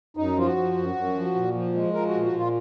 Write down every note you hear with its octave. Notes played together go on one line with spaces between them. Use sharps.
F#2 D#4
F3 F4
F#4
F3
F#2
F#2
F3
A#2
F3
G#3
F3 A#4
F#4
A#2
F#4
A#2 F4